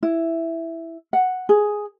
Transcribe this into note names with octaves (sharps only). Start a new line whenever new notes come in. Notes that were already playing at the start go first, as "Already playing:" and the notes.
E4
F#5
G#4